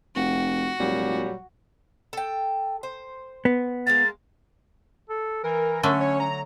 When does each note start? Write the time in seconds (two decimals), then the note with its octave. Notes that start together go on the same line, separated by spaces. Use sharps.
0.15 F1 F#4
0.79 F1 A#2 F#3 G3
2.13 A4 G5
2.83 C5
3.45 B3
3.87 G#3 A#3 F5 A6
5.09 A4
5.44 E3 A#4
5.83 D3 F#3 A3 C#4 D4
6.00 C#5
6.20 F#3 A#5